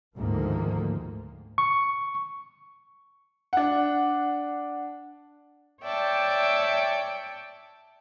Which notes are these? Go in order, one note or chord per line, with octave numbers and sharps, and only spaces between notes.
D2 G#2 D#3 F3 A3 A#3
C#6
D4 F#5
C#5 D5 E5 G5 A5